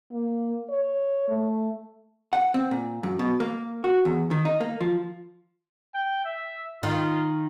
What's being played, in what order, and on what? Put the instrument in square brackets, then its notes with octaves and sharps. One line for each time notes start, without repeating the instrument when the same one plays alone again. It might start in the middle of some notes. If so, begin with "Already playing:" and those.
[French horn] A#3
C#5
A3
[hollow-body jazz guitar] F#5
C4
A#2
F#2
B2
A#3
F#4
E2
D#3
D#4
A#3
F3
[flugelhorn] G5
E5
[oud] D#3 [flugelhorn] F4